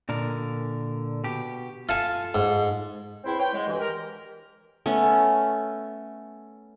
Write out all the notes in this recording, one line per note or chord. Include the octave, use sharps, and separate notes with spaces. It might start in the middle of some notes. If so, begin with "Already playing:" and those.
A#2 D3 A#4
B2 G4
F4 A4 F5 G#5
G#2
E2 C4 E4 G5 C6
B4 C#5 G5
C#3 F#3 G#3
D2 G2 E3
G4 A#4
A3 B3 C#4